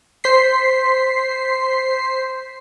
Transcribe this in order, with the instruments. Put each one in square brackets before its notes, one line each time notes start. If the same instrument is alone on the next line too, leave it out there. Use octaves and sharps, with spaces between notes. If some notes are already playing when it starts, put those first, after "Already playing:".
[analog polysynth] C5 C6 B6 C7